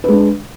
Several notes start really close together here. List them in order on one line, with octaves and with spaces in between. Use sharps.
B4 G#3 D4